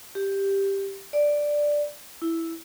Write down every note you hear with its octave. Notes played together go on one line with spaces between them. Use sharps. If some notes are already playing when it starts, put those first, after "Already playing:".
G4
D5
E4